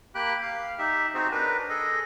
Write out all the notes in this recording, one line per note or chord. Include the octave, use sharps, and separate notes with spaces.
A#3 G4 G5 B5 F#6
F5
D#4 G4 E5
C4 D#4 F#4 G#4 C5
D4 A#4 B4
G#4 A4 D#5